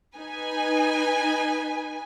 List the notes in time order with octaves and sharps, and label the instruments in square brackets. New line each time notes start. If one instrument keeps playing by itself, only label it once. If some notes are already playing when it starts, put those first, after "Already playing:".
[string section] D#4 B4 G#5